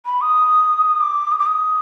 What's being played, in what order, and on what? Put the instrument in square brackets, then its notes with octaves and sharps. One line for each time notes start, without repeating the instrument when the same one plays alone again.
[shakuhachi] B5
D#6
D6
D#6
D6
D#6